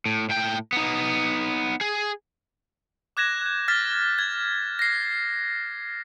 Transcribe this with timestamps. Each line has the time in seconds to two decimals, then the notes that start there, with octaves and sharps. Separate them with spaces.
0.06 A2
0.29 A2 G5
0.73 B3 D#4
1.81 G#4
3.17 D6 F#6 G#6 A#6 E7
3.42 F#6 G6
3.68 F6 A6 B6
4.19 G#6
4.79 A#6 C7